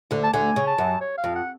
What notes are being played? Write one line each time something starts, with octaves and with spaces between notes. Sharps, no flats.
D2 D3
A5
D2 D3 G#5
C#3
A5
F#2
C#5
F5
F2
F#5